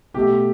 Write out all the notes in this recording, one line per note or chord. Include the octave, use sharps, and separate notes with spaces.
B2 A3 G4